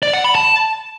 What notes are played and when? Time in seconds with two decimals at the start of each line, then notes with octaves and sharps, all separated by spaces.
0.03 D5
0.13 F#5
0.24 B5
0.35 A5